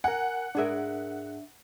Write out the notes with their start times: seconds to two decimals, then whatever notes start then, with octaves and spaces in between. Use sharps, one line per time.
0.04 A#4 F#5 G#5
0.55 G#2 D4 G#4 A#4 E5